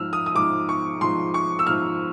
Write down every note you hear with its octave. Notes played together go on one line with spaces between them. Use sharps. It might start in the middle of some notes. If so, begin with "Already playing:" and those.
Already playing: G#2 F3 E6 F6
D#6
D#6
G#2 F3 D6
C#6
G#2 F3 C6
C#6
E6
G#2 F3 F6